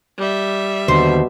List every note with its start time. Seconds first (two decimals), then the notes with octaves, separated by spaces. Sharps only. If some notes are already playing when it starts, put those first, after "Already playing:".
0.18 G3 E5
0.88 D#2 B2 D3 C5